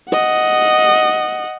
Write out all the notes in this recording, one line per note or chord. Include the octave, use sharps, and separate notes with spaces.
D#5 F#5